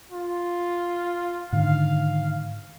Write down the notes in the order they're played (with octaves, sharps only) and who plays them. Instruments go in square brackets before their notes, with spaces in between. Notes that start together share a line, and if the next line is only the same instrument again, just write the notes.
[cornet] F4
[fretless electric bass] G#2 D3 D#3 [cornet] F5